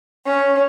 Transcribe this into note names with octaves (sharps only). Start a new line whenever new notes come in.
C#4